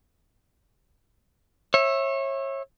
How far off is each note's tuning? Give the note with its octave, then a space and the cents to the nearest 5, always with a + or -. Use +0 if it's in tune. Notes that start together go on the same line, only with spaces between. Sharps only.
C#5 -30 E5 +0